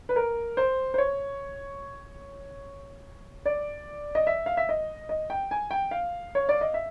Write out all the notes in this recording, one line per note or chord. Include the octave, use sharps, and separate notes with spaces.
B4
A#4
C5
C5
C#5
D5
D#5
E5
F5
E5
D#5
D#5
G5
G#5
G5
F5
C#5
D5
D#5
E5